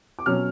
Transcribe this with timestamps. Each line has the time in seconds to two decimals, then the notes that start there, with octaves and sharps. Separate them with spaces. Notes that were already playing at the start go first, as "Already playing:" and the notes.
0.19 D6
0.26 B2 F#3 C#4 F6